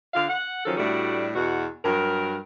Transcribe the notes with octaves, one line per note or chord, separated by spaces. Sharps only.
D3 F4 F5
F#5
D#3 F3 F#3 C#4 A4
A2 G3 A3 D4 F#4
E2 B2 F#4
G2 F#3 A#4